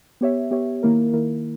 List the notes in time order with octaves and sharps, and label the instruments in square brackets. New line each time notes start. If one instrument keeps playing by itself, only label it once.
[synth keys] B3 G4 C#5 E5
B3 G4 C#5 E5
D#3 A#3 E4 A#4
D#3 A#3 E4 A#4